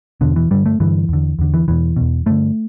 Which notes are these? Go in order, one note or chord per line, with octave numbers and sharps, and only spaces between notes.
E2 B2 D3
E3
G2 D3 G3
A3
G2 D3 E3
E2 D3
E2 D3
E3
E2 B2 E3
E2 B2
G2 D3 A3